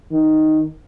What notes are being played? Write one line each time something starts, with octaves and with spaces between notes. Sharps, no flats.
D#3